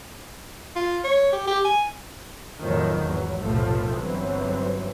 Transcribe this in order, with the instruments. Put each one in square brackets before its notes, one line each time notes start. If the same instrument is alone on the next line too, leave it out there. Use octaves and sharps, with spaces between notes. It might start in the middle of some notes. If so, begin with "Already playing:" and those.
[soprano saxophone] F4
C#5
G4
G4
G#5
[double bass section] F2 A2 D#3 F3 F#3
G#1 E2 F#3
F1 B1 A2 F3 A3
G1 F#2 E3 F#3 C4